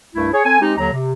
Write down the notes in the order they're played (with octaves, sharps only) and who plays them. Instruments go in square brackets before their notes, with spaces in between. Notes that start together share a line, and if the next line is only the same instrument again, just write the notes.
[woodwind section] C2 G2 A3 E4
G#4 C#5
C4 A4 G#5
G#3 C4 D#4 G4
D#2 D3 F#3 A#5
C3